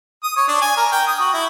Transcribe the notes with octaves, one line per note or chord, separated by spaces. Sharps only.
D#6
C#5
D4
G#5
A#4
G5
D#6
F#4
E4